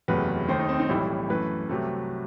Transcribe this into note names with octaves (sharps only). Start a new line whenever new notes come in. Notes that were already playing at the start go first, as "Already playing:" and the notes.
F#1 E2 C3 F#3 A3 B4
D#2 D#3 A3 C5
D#4
C4
D#4
B1 A2 E3 G3 E4
F#2 E3 A3 B4
C2 C3 F#3 A3